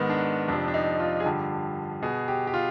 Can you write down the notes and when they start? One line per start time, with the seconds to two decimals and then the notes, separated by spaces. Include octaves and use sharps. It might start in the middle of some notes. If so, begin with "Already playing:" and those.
Already playing: G#2 D#3 B3
0.10 D4
0.48 F2 C3 F3 D4
0.68 D4
0.74 D#4
1.00 F4
1.20 G#4
1.25 G2 D3 F3 G4
2.02 B2 G#4
2.28 G4
2.47 G4
2.54 F4